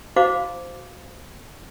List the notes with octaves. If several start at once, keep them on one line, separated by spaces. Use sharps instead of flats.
E4 F#4 C5 F5 D6